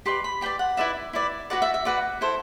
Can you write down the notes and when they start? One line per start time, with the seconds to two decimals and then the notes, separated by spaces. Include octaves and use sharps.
0.06 G4 B4 D5 C6
0.24 B5
0.41 G4 B4 D5 G5
0.59 F#5
0.77 E4 B4 D5 E5
1.13 E4 B4 D5
1.50 F#4 B4 D5 F#5
1.62 E5
1.74 E5
1.85 F#4 B4 D5 F#5
2.21 E4 A4 C5